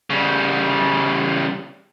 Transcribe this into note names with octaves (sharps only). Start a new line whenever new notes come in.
C#3 G3